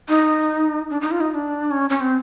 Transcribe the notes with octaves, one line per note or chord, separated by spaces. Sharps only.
D#4
D4
D#4
F4
D#4
D#4
D4
C#4
C#4
C4